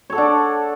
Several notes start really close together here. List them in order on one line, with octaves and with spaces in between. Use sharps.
C#5 A4 F#5 D4